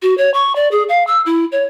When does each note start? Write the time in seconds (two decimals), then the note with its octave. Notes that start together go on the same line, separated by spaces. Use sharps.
0.02 F#4
0.18 C#5
0.34 C#6
0.56 D5
0.72 G#4
0.89 F5
1.07 E6
1.26 E4
1.52 C#5